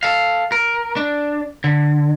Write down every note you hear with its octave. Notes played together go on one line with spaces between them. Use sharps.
A4 F5
A#4
D4
D3